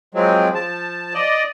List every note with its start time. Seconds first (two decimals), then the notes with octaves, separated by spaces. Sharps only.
0.15 F3 F#3 G#3 C4
0.55 F3 A5
1.14 D5 D#5